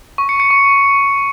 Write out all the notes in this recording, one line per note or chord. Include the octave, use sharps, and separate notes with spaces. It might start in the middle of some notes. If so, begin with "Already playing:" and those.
C#6
C#7
C#7
C#6